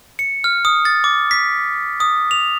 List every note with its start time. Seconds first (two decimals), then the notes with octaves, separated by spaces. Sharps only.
0.19 C#7
0.44 F6
0.65 D#6
0.85 A6
1.04 D6
1.31 B6
2.00 D#6
2.31 F7